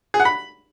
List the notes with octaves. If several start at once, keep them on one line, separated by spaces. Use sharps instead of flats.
G#4
F#5
B5